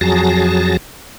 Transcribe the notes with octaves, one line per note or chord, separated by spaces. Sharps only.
F2 F#3 G#4 A5 A#6